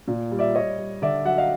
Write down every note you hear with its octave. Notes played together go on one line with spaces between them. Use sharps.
A#2
G3
D5 E5
G3 C#5 D#5
G3
D3 D5 E5
F#3 E5 F#5
D#5 F5